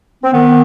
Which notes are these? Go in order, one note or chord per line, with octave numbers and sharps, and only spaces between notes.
C4
D#3 B3